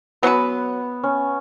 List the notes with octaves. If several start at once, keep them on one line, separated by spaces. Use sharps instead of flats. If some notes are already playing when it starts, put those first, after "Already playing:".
F#3 B3 C#4 F#4 B4
C#4